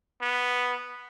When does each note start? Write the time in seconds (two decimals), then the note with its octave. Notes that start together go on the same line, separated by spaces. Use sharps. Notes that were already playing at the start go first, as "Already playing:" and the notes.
0.21 B3